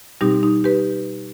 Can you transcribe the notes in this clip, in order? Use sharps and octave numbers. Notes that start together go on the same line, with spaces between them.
B2 G3 C4 D#4 G4
D#4
G4 B4